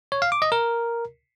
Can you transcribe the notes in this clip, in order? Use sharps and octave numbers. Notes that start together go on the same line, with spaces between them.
C#5
F5
D6
D#5
A#4